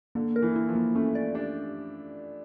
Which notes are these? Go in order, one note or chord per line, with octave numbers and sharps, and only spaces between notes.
D3 A#3
A#4
E3
E4
F3
A#3
A3 C#4
D5
D4 G4